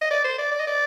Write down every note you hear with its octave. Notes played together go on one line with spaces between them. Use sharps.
D#5
D5
C5
D5
D5
D#5
D5